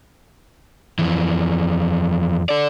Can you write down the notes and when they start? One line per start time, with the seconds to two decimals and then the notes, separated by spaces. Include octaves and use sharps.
0.99 F2 E3
2.49 A4 D5